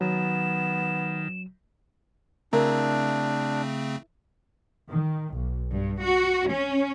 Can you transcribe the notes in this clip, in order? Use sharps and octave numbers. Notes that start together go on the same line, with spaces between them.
D#3 F#3 B3 E7
C#3 A3 C4 D4 E4 A#4
D#3
B1
G2
F#4
C#4